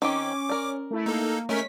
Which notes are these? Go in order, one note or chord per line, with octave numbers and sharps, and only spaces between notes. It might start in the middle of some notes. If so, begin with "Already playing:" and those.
D#3 C4 C#4 G4 D6
A#4 D5
A3 E4
A#3 D#4 A4
G#3 A3 C#4 A#4 C#5 B6